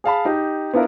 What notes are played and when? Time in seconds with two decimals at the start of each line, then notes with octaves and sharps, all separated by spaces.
0.04 G#4 F5 A5 B5
0.25 D#4 G4
0.73 B3 D4 E4 F4 A#4